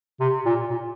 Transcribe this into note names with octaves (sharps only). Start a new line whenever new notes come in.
C3
A#2
A#2